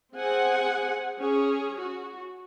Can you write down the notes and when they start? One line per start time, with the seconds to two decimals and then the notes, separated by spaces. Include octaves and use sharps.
0.15 C4 G#4 F#5 G#5
1.19 C#4 G#4
1.79 F#4